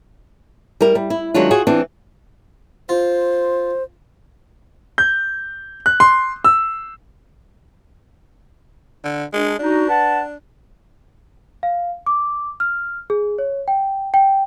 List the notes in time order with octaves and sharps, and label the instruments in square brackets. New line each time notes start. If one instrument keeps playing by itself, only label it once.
[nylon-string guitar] G3 E4 A#4
G3
E4
D#3 F#3 G#3 D4 F4
F4 F#4 G#4
E3 C4 D4 F4
[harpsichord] F4 [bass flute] C5
[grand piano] G6
F#6
C6
E6
[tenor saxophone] D3
[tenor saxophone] G#3 [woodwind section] D4
[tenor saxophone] D4 [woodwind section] D#4 F#4
[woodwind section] B4 F#5 A5
[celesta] F5
D6
F6
G#4
C#5
G5
G5